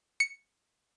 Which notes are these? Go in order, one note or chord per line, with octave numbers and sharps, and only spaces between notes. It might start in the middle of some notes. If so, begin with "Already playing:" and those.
C#7